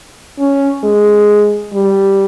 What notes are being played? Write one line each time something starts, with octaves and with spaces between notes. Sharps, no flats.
C#4
G#3
G3